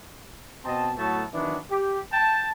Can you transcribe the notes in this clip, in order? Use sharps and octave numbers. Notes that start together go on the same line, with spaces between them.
B2 C4 D#5 A5
A2 F#3 A3 B3 A5
D#3 E3 F#3 B3 D4
G4
G5 A5